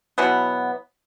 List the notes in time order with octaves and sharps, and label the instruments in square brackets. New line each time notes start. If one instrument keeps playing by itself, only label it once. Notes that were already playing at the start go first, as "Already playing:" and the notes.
[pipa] B2 E3 F#3 B3